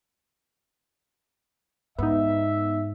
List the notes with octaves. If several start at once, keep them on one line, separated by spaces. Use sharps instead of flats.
G#2 B3 D#4 E5